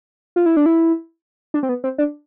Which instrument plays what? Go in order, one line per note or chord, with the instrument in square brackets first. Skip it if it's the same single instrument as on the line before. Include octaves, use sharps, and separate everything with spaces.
[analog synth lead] F4
E4
D4
E4
D4
C4
B3
C4
D4